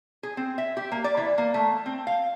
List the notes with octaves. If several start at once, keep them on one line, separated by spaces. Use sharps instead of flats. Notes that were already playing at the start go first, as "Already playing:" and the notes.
G#4
C4
E5
G4
A#3
D5
E3
A#3
A3
C4
F5